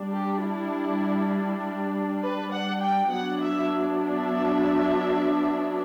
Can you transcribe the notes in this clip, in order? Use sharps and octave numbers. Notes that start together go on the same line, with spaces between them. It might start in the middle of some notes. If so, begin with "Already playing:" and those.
Already playing: G3 D4
G4
E4
B4
F#5
G5
F#3 B3 D4 F#5
E5
E5